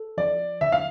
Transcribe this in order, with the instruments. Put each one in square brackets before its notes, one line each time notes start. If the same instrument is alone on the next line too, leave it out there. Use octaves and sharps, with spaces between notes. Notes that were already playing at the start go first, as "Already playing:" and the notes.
Already playing: [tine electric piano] A4
[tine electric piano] F3 [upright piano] D5
[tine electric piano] D3 [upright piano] E5
[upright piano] F5